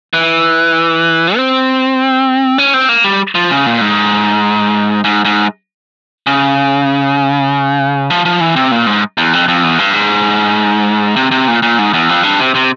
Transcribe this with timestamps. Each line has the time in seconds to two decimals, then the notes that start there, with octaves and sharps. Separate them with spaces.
0.14 E3
1.36 C4
2.58 C#4
2.74 C4
2.89 A#3
3.04 G3
3.35 F3
3.51 C#3
3.66 A#2
3.81 G#2
5.04 G#2
5.25 G#2
6.27 C#3
8.10 F3
8.25 F3
8.40 E3
8.56 C3
8.72 A#2
8.86 G#2
9.18 E2
9.33 F2
9.48 F2
9.64 E2
9.79 G2
9.93 G#2
11.16 C3
11.31 C3
11.48 A#2
11.62 A#2
11.78 G#2
11.93 E2
12.09 F2
12.23 G2
12.40 C3
12.55 C3